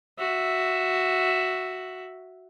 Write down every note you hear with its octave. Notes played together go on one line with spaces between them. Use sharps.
F#4 E5